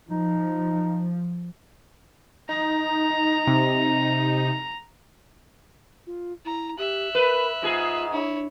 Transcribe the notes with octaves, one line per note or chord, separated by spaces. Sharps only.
F3 D#4
D#4 A#5
C3
F4
E4 A#5
G4 E5 F#6
A#4 B4
G#2 F4 G#4
D4 E4 C#5